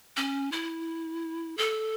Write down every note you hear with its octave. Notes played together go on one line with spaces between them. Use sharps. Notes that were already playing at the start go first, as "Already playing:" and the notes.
C#4
E4
A4